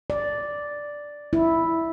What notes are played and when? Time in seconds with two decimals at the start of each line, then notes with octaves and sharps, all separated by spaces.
0.10 D5
1.33 E4